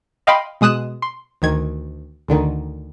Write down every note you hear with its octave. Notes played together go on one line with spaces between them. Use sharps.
D#5 F5 G5 B5 C6
B2 G#3 D#6 F#6 E7
C6
D2 D#3 G#6
D2 D3 D#3